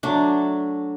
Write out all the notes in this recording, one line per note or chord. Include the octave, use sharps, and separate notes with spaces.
F#3 A3 D4